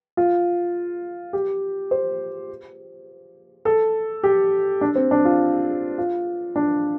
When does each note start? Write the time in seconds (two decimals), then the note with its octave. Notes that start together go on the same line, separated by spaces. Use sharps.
0.17 F4
1.33 G4
1.91 C5
3.65 A4
4.23 G4
4.81 D4
4.95 C4
5.11 D4
5.25 F4
5.98 F4
6.56 D4